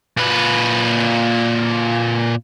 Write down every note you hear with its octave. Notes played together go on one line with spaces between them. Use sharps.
A#2 B4